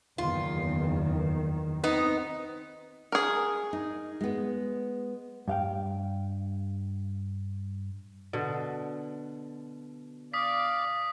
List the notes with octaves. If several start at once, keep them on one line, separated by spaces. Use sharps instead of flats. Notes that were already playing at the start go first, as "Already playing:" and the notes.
F#1 E2 D#3 F4
B3 C4 D#4
G#4 A#4
D#4
G#3 B3
G2 F5 G5
B2 D3
D5 F5 D#6 B6